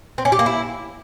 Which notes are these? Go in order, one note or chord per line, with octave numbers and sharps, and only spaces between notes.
C4
C#4
G4
A#3
E4